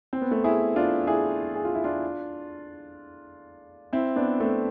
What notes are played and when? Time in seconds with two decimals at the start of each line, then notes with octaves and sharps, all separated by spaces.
0.13 C4
0.21 B3
0.31 A3 C4
0.44 E4 G#4
0.76 D4 F4
1.07 E4 G#4
1.55 G#4
1.65 F4
1.75 E4
1.84 D4 F4
3.93 C4 E4
4.16 B3 D4
4.40 A3 C4